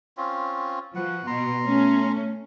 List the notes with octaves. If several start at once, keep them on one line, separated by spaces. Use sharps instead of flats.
C4 C#4 F4
F3 F#4 B4 F#5
B2 A#5 C6
A3 C#4